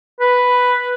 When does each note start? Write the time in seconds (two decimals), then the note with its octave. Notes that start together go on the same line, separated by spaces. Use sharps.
0.20 B4